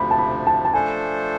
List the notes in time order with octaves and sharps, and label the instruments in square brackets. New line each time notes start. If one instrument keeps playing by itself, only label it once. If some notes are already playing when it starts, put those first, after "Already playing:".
Already playing: [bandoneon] D2 C3 F3 [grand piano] B5
[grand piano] A5
B5
A5
A5
[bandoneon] F3 A3 D4 A4 C5 [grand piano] G#5